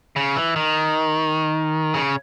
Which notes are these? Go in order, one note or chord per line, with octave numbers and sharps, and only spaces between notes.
C#3
E3
D#3
C#3